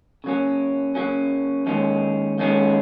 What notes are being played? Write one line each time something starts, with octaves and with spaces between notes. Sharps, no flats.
C#3 F#3 A#3 C#4
C#3 F#3 A#3 C#4
D#2 D#3 G#3 C#4
D#2 D#3 G#3 C#4